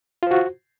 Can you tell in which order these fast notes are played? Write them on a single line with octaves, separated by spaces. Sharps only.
F4 C5 F#4